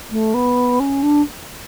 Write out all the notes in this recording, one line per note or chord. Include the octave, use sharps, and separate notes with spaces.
A3
B3
C#4
D4